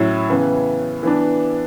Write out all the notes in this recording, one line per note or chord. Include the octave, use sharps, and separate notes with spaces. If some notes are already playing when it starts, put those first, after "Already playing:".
Already playing: A2 F#3 C#4 E4
C#3 E3 B3
E3 B3 D4